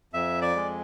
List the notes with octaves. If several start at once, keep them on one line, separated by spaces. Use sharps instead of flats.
F2 E5
D5
G#3